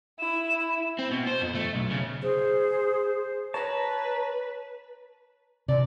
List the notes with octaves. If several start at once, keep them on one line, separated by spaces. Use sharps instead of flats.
E4 E7
C4
B2
C5
F2
A3
B1
C#3
G#4 C5
B4 C#5 A5 A#5
C3 D5